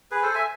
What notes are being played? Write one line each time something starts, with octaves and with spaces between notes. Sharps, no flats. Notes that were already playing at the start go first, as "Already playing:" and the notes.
G#4 B4
A4 C5
E5 G#5